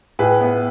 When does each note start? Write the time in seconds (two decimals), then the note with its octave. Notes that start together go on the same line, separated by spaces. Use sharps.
0.19 A2 G#4 B4
0.41 B3